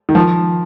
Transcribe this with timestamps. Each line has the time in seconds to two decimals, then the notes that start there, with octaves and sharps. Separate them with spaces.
0.09 D#3
0.15 F3